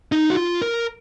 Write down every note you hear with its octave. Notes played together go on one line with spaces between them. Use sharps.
D#4
F#4
F4
A#4